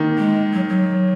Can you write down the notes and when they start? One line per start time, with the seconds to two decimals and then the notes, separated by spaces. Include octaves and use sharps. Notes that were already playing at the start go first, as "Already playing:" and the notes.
Already playing: D#3 A#3
0.18 G#3
0.53 F#3
0.69 F#3